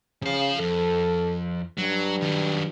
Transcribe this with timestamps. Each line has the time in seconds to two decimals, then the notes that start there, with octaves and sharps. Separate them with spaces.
0.22 C#3 F3 F5
0.60 F2 A4
1.78 G2 F#3
2.22 D#3 F#3